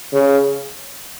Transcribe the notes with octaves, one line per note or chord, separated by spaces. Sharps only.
C#3